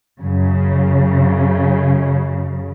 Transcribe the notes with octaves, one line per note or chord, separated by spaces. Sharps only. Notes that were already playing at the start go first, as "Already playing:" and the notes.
F#2 C#3